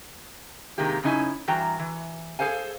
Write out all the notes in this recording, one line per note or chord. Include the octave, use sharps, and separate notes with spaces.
C3 D#3 G#3 A#3 G4
F#2 C#3 C#4 D#4 E4 G#5
G2 E3 F#4 G5 A#5
E3
G#4 A4 C5 F5 G#5